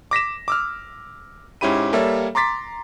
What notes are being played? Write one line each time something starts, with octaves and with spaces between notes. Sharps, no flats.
D6 A#6 B6 E7
D6 E6 F6
G#2 C#4 E4 G4 B5 D#7
G3 A#3 A4 C#5 E5
A#5 C6 D6 A6 B6